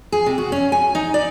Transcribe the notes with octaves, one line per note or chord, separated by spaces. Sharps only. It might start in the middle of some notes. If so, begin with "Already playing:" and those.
G#4
C3
F#4
C#4
G#5
D#4
D5